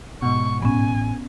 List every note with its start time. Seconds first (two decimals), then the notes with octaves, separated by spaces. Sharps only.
0.22 G#2 B2 C#6
0.62 A1 B3 C#4 G#5